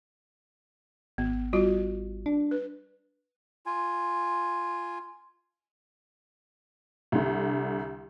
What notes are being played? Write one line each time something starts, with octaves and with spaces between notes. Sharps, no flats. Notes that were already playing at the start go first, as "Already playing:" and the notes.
G#1 B3
G3 F4 F#4
D4
B4
F4 G#5
C2 D3